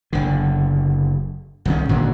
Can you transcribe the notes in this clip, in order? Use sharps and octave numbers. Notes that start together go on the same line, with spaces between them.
F#1 D3
C2 D#3 C#4
G#1 A#2 D3 F#3